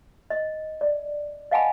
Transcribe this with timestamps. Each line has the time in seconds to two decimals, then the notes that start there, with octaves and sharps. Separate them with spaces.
0.30 D#5
0.81 D5
1.51 D#5 F5 F#5 G#5 A5 B5